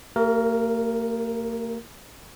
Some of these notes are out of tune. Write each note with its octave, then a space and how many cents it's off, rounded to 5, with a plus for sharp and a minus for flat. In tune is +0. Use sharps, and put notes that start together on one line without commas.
A#3 -45 G4 -5 A#4 +0